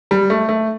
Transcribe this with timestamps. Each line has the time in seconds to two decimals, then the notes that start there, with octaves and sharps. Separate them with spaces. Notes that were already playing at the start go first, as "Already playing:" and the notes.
0.11 G3
0.30 A3
0.49 A3